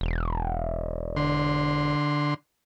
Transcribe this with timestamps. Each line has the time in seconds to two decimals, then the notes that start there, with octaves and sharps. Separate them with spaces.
0.01 E1
1.17 D3 C6